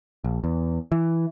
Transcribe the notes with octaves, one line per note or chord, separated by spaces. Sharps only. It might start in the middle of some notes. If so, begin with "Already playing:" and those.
A#1
E2
E3